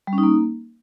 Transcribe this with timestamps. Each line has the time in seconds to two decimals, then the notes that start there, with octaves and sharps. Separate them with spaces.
0.07 G3
0.13 C#4
0.18 D#4
0.23 A#3